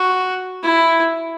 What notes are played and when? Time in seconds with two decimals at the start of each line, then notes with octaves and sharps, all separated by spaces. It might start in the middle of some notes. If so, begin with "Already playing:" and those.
Already playing: F#4
0.63 E4